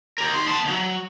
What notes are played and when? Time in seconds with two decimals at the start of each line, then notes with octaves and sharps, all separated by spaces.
0.18 G4 A#4
0.33 D#3 C6
0.46 B3 A5
0.65 D#2 F#3